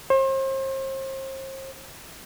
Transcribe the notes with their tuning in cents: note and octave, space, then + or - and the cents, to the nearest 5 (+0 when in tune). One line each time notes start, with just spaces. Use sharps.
C5 +40